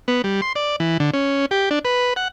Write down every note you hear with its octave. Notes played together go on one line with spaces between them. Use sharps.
B3
G3
C6
D5
E3
D3
C#4
G4
D4
B4
F#5